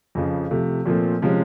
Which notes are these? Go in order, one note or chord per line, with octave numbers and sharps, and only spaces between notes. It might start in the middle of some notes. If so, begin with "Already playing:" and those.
F2 C#3 F3
C3 F3 A3
A#2 F3 A3 C4
C3 F3 G#3 C#4